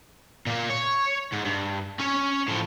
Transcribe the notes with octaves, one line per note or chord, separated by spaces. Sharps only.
A#2 A#3
C#5
G#2
G2
C#4 C#5
A2 F3